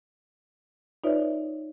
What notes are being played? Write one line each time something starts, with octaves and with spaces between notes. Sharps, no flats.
D#4 F4 B4 C#5 D5 E5